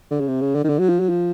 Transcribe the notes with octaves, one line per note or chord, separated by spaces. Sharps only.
D3
C#3
C3
C#3
D3
D#3
D3
F#3
F3
F#3
F3